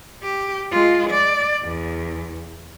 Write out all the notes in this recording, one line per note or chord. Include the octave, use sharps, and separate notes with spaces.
G4
G#3 F4
D5
E2